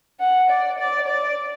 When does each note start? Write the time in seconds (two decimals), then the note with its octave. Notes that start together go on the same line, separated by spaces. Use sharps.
0.20 F#5
0.50 D5
0.79 D5
1.08 D5